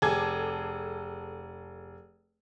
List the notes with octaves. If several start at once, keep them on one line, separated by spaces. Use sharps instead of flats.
F1 G#4 A4 D6 G#6